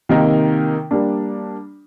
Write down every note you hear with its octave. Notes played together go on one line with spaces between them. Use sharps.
C3 D#3 A#3 D#4 A#4
G3 A#3 D4